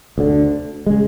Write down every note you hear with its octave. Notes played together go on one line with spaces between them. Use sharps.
D2 D3
C#3 G#3